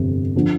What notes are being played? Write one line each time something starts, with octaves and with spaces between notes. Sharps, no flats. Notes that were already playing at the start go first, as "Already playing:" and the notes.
Already playing: G1 F2 C3
D3 F3